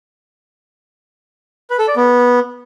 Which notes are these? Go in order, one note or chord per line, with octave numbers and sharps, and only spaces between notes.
B4
A4
D5
B3